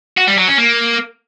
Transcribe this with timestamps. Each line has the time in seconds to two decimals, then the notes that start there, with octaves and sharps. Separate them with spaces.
0.17 F#4
0.27 G3
0.37 F#3
0.48 C#4
0.58 A#3